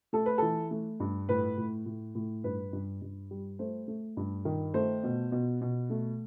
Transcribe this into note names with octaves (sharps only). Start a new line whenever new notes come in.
A3 A4
B4
E3 A4
A3
G2
A2 B4
A2
A2
A2
G2 B4
G2
G2
G3
A3 C5
A3
G2
D#3
A3 C5
B2
B2
B2
A3